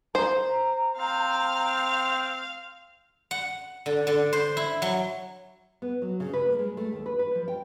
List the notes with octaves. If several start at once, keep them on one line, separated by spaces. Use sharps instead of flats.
C5 A#5
C4 F5
F#5
D3
D3
C5
E4
F#3
B3
F#3
C#3
B4
A#3
G#3
A3
D#2
B4
B4
F3
G5